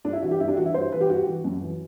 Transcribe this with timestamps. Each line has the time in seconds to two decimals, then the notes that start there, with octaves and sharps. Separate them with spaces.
0.05 G2 D4
0.13 E4
0.22 E3 F#4
0.31 G4
0.40 G2 E4
0.48 D4
0.57 E3 F#4
0.66 E4
0.74 G2 C5
0.92 E3 B4
1.01 G4
1.10 G2 F#4
1.26 E3
1.44 F#2
1.61 E3